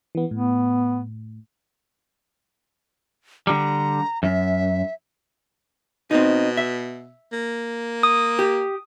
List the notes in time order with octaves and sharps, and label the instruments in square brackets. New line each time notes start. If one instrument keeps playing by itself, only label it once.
[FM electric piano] E3 B3
[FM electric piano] A2 [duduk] B3
[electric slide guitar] D3 G3 [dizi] A#5
[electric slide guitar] F#2 [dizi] E5
[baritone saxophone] B2 [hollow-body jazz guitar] C4 D#4
[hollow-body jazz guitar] E5
[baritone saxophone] A#3
[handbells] D#6
[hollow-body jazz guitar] G4